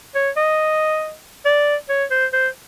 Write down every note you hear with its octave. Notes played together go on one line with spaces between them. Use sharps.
C#5
D#5
D5
C#5
C5
C5